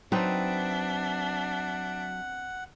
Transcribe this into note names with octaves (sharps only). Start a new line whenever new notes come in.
F#3 C4 D4 D#4 B4 E5 F#5